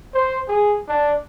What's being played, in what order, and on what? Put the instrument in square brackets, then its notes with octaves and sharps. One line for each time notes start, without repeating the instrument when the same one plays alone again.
[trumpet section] C5
G#4
D4